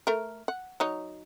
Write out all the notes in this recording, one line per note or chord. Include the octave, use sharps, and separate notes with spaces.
A3 A#4
F#5
F#3 D#4 C#5